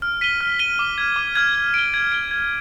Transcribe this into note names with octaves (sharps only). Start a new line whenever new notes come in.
F6
B6 D#7 G7
F6
B6 D#7 G7
D6
F6 G#6
D6
F6 G#6
G#6
D7 G7
G#6
D7 G7
G#6